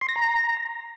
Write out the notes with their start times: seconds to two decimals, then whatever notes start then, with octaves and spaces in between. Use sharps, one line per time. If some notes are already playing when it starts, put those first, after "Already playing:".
0.01 C6
0.09 A#6
0.16 A#5